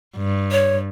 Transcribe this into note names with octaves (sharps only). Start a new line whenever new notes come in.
G2
C#5